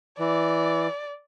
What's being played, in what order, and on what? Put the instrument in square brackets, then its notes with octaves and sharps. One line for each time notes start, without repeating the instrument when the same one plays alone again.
[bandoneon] E3 [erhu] D5